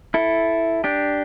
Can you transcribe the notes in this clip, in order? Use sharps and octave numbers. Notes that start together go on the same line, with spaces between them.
E4 A4
D4 G4